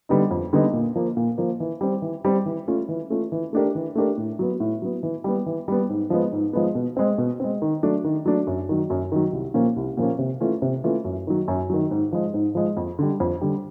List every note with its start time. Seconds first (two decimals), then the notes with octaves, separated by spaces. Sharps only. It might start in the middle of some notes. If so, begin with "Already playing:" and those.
0.09 D3 G3 B3 D#4
0.31 F2
0.53 D3 G3 B3 D#4
0.73 A#2
0.95 F3 A#3
1.17 A#2
1.38 F3 A#3
1.60 E3
1.81 G3 C4
2.02 E3
2.25 G3 C4
2.46 E3
2.68 A3 C#4 F4
2.89 E3
3.10 A3 C#4 F4
3.32 E3
3.53 A3 D4 G4 A#4
3.75 E3
3.95 A3 D4 G4 A#4
4.17 A2
4.39 F#3 B3
4.60 A2
4.82 F#3 B3
5.03 E3
5.24 G3 B3
5.46 E3
5.68 G3 B3
5.89 G#2
6.10 F3 G#3 B3
6.32 G#2
6.53 F3 G#3 B3
6.75 B2
6.97 G#3 C4
7.18 B2
7.40 G#3 C4
7.62 D#3
7.83 F#3 A3 D4
8.04 D#3
8.26 F#3 A3 D4
8.47 F#2
8.69 D#3 F#3
8.90 F#2
9.12 D#3 F#3
9.33 C2
9.54 A#2 F3 A#3 C#4
9.76 C2
9.97 A#2 F3 A#3 C#4
10.19 C3
10.41 E3 A3 C#4 F4
10.62 C3
10.84 E3 A3 C#4 F4
11.05 F#2
11.27 D#3 F#3
11.48 F#2
11.70 D#3 F#3
11.91 G#2
12.13 F3 G#3
12.34 G#2
12.55 F3 G#3
12.77 F2
12.99 D3 G3
13.20 F2
13.41 D3 G3